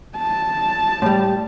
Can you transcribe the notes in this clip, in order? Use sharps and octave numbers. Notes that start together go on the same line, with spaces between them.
A5
A2 G3